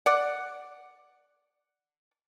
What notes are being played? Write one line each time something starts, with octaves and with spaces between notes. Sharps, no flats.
D5 F#5